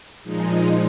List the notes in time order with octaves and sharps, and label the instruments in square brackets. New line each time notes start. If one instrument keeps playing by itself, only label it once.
[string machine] A#2 F3 G#3 D#4